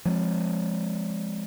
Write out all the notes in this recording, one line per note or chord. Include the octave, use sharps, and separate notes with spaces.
F3 G#3 C4